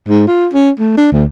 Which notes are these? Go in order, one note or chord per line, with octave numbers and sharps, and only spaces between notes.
G#2
F4
C#4
A3
D4
D2